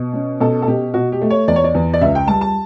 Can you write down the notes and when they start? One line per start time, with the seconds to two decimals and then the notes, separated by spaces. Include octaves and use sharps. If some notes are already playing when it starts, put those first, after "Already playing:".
Already playing: B2
0.13 C#4
0.40 B2 A4
0.62 A4
0.67 B2 G4
0.94 B2 F#4
1.12 G4
1.22 A3
1.30 C#5
1.48 E2 D5
1.56 C#5
1.64 D5
1.74 E2
1.94 D5
2.01 C#2 E5
2.15 G5
2.28 G3 A5
2.41 A5